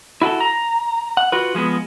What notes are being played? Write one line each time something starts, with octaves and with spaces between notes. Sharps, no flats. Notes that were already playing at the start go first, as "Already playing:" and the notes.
E4 F#4 G#4 A4
A#5
F#5
F4 F#4 B4
F3 G#3 A3 B3